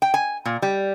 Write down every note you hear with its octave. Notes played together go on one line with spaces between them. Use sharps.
G5
G#5
A#2
G3